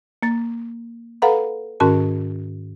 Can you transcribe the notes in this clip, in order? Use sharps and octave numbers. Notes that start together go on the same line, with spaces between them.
A#3 A6
A4 B4 F5 F#5 A#5 B5
G#2 D#3 C#4 F#4 A#4 A5